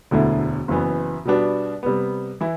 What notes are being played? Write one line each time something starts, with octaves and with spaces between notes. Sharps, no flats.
E1 D2 D3 A3 E4
F#1 F#2 E3 B3
B2 G3 B3 D4 F#4
C3 G3 B3
E3 E4